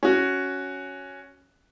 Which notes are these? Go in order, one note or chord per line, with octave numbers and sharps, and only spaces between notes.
C#4 F#4